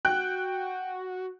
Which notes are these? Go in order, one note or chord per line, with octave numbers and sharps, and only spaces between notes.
F#4 G5 F#6